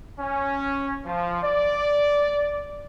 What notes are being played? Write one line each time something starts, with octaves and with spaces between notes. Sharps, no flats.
C#4
F3
D5